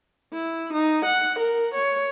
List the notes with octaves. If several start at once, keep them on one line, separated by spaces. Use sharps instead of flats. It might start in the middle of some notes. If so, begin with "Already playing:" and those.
E4
D#4
F#5
A#4
C#5